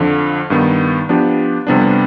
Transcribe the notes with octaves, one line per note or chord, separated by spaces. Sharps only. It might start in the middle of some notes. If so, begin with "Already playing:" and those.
Already playing: F2 D3 F3
G2 D#3 B3
F3 B3 D4 G4
F2 C3 G3 B3 D4